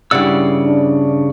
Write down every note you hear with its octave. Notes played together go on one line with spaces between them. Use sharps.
G2 C#3 E4 D5 F#5 E6
D4